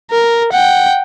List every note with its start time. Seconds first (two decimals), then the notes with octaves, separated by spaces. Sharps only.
0.11 A#4
0.52 F#5 G5